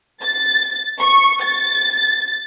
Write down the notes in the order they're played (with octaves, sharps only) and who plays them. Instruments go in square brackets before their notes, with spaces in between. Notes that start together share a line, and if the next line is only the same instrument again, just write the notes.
[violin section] A6
C#6
A6